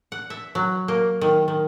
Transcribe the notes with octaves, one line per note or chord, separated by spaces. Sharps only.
F#5
E5
F#3
A#3
D#3
D#3